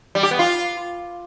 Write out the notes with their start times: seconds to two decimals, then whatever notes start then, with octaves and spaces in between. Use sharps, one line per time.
0.15 G3
0.23 G4
0.31 B3
0.39 F4